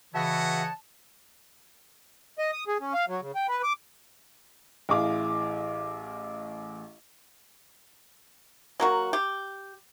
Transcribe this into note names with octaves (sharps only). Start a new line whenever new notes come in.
C#3 E3 F#4 C#5 D#5 E5 F#5 A5
D#5
D#6
G#4
C#4
F5
F#3
C#3
G5
B4
D6
A1 E4 G#4 F5 D6
F#3 A#3 F#4
G4